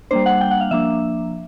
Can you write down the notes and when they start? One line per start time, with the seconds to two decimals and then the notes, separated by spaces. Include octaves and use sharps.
0.11 G3 A#3 D4 C5
0.26 F#5
0.41 G5
0.51 F#5
0.61 F5
0.71 F3 A#3 D4 E5